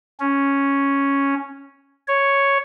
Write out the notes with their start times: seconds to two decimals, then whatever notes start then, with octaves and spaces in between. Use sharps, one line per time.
0.20 C#4
2.08 C#5